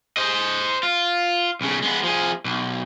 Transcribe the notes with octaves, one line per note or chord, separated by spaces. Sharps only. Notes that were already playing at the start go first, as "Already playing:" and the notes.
C5 D#5
F4
B1 C#3
G#3 B3
F3 G#4
B1